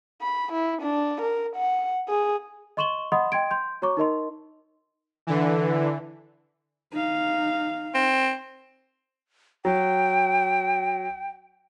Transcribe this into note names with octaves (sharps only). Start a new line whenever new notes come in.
B5
E4
D4
A#4
F#5
G#4
D#5 C6 C#6 E7 F#7 G7
D#5 F#5 B5 C6 D#6
D#5 G5 C6 G#6 D7
C6 G6
F#4 C#5 A#5 C#6 D6
D#4 A#4 D#5 C6
D3 E3
D#4 F5
C4
F#3 G5